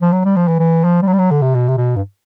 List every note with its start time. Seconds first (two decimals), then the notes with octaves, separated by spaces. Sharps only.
0.01 F3
0.12 F#3
0.25 G3
0.36 F3
0.48 E3
0.59 E3
0.84 F3
1.02 G3
1.07 F#3
1.13 G3
1.18 F#3
1.31 D3
1.42 C3
1.55 B2
1.68 C3
1.77 B2
1.96 G2